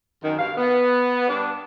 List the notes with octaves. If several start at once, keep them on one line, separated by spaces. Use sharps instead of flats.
F#2 D#3
G2 B2 F5
B3
G2 D4